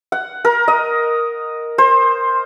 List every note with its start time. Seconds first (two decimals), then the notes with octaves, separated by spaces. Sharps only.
0.12 F#5
0.45 A#4
0.68 D#5
1.78 C5